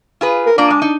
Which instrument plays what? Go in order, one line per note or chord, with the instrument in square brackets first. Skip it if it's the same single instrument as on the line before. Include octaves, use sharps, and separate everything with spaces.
[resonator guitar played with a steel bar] F4 G#4 B4
[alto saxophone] A#4
[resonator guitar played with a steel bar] A#3 F4 D5 [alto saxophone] D4
[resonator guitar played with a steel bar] G#3
D#4